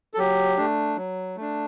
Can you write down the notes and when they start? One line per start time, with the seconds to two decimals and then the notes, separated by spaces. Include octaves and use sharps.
0.14 A4
0.18 F#3 G4
0.58 A3 D4
0.97 F#3
1.37 A3 D4